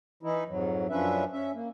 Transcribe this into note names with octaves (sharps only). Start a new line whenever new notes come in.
E3 D#4 E4
F2 G#2 F#3
F#2 F3 C#4 D4 B4 E5
C#4 E5
A#3